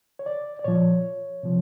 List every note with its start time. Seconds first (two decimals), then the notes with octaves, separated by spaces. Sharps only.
0.19 C#5
0.26 D5
0.59 D5
0.64 A#2 F3 C#5
1.43 C3 F3